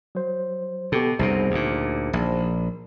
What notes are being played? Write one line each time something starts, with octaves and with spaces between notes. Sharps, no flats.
F#3 C5
B2 B3 G4 A4
C2 F#2 B2 D#4 G#4 C5
D2 A#2
A#1